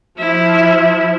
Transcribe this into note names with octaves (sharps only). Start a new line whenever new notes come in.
F3 E4